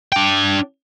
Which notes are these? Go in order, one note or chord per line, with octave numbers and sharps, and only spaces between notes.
D4 G5